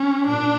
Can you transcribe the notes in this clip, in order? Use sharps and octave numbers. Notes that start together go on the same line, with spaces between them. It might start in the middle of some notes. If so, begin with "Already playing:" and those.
Already playing: C#4
A#2 D4